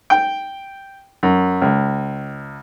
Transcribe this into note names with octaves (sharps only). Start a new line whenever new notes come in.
G5
F#2
C#2